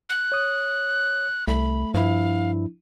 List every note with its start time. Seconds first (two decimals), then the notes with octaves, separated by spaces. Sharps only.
0.09 F#6
0.32 C#5 D#6
1.47 C2 A3 B5
1.94 G2 F3 D4 E4 F5